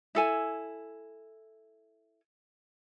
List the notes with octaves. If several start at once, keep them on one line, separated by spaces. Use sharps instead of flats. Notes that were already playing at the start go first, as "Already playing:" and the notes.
E4 A4 G#5